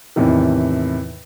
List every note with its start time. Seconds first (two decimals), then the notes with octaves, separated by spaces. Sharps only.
0.16 E2 A2 C3 D#3